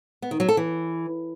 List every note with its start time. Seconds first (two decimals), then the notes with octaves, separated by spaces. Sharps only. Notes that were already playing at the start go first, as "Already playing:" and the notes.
0.22 B3
0.31 D#3
0.40 F#3
0.49 A4
0.57 E3